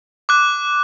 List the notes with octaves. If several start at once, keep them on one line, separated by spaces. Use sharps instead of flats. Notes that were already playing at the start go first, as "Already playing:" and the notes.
D6 F#6